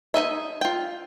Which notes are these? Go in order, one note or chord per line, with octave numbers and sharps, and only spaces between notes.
D#4 E4 D#5 E5
F4 G5